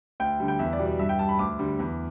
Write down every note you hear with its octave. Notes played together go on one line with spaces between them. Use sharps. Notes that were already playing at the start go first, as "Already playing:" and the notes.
D2 G5
D3 G3
G5
E2 E5
D5
B2 G3
D5
G2 E5
G5
G3 A5
B5
D2 D6
D3 G3
E2